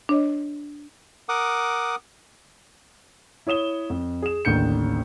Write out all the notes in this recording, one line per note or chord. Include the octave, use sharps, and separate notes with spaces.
D4 C#5 D#5
A#4 F#5 D6 D#6
E4 C#5 D#6 E7 G7
F2
G#4 E7
A1 D#2 D3 G6 C#7